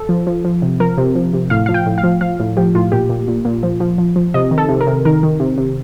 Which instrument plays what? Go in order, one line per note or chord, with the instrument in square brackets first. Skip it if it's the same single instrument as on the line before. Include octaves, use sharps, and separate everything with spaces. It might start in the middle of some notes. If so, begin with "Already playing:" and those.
Already playing: [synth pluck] A4
F3
F3
F3
C3
F3 A#4
C3
F3
C3
A2 F5
F3 F5
G5
A2
F5
F3
F3 F5
A2
F3 G4
A2 F4
A#2 G4
A#2
A#2
A#2
F3
F3
F3
F3
C3 D#5
D#3
A4
C3
A#4
C3
D#3 A#4
D#3
C3
C3